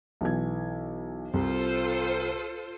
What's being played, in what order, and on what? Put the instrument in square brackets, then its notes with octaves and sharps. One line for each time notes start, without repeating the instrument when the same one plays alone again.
[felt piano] B1 E3 G#6
[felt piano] C2 [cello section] F4 A4 C5